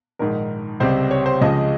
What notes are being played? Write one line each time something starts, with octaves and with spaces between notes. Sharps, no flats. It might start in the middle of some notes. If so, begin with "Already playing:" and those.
A#1 G#2 D#3 A#4
C#2 C3 G3 C4 C5
C#5
C5
C#2 C#3 F3 G#3 D#5